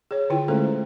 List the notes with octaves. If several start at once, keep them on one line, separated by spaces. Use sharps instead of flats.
G#4 C#5
D3 E4 F4 G5
G#3 A3 C#4 A4 C5